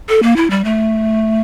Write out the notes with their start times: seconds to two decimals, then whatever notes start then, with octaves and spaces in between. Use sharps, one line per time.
0.09 A4
0.23 A#3
0.36 E4
0.50 G3
0.64 A3